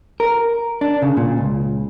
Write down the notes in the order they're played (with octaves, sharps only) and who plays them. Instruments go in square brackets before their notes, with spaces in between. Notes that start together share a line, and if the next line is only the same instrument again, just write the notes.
[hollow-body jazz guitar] A#4
D4
C#3
A#2
C#2